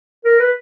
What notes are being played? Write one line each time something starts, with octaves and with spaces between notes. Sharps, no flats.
A#4
B4